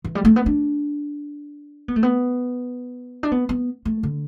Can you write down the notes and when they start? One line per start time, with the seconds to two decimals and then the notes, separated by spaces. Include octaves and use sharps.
0.04 E3
0.15 G3
0.25 A3
0.36 B3
0.46 D4
1.88 B3
1.96 A3
2.03 B3
3.23 D4
3.32 B3
3.49 B3
3.85 A3
4.03 D3